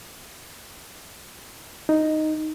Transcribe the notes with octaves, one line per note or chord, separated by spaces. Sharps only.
D#4